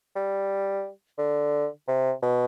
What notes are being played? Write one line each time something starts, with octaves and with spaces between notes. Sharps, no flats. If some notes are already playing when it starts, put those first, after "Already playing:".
G3
D3
C3
B2